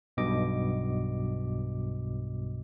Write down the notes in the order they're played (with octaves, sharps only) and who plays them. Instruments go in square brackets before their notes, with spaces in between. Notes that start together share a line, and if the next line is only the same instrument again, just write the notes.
[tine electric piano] B1 G2 B2 D#5 D6